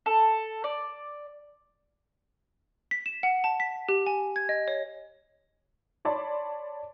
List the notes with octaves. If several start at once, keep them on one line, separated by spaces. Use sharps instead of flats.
A4
D5
B6
E7
F#5
A5
B6
G4
G#5
G#6
D#5
C#5
C#5 D5 A5 B5 C6